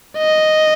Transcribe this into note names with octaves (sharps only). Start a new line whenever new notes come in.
D#5